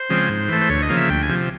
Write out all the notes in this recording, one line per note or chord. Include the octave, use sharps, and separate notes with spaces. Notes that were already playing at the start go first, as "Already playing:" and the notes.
Already playing: C5
C#3 F3 G#3 C4
G#2
E3 A3
C5
D2 C#5
D#5
C#3 F3 A#3
E5
D2 G5
G#5
C3 F3